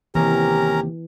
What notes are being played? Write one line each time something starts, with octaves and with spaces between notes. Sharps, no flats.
D#2 C3 E3 C#4 G4 A#4 A#5